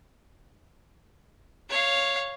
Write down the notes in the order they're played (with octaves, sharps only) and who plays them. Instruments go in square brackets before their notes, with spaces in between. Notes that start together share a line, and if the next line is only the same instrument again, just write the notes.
[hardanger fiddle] C#5 F5